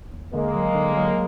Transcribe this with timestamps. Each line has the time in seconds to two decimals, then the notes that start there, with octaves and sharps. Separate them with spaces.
0.13 D#2
0.34 D3 G#3 A#3
0.55 F#3
0.75 D3
0.96 F#3